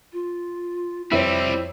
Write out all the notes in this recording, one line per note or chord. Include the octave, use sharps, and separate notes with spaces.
F4
F2 G3 C4 E4 C5 C#5